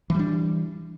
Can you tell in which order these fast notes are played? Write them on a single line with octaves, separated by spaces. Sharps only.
E3 G3 D4